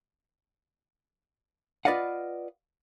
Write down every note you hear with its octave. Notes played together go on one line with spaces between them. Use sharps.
F4 B4 D5 D#5 F5 F#5